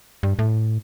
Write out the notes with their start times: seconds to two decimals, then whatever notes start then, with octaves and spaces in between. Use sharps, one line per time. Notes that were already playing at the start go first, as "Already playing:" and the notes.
0.23 G2
0.39 A2